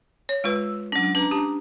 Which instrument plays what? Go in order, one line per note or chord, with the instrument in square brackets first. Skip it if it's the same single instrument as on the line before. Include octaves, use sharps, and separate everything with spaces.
[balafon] C#5
[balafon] G#3 F4 B4 [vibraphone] E6
[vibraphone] F#3 D4 [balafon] C#4
[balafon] C#4 B4 [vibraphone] D4 A#5
[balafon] G4 A5